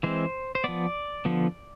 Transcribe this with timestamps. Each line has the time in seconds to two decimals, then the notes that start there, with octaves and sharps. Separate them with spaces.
0.03 E3 G#3 C4 C5
0.55 C5
0.64 F3 B3 D5
1.25 D3 F3 B3